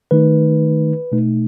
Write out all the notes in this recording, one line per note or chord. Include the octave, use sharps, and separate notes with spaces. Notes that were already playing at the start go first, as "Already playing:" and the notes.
D#3 A3 D#4 B4
B2 A3 D#4